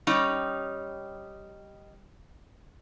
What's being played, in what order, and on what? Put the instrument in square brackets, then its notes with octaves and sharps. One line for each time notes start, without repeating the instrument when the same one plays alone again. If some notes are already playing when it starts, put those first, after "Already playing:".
[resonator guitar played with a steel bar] G3 C#4 D#4